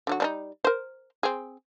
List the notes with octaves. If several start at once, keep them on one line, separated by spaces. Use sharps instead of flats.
D3 F#3 F#4
G3 D4 D#4
A#4 C5
C4 G#4